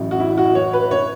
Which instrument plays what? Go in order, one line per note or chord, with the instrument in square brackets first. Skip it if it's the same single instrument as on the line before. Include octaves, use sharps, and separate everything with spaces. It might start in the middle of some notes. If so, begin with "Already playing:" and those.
Already playing: [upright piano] A1 A2 F#3
F#4
E4
F#4
C#5
B4
C#5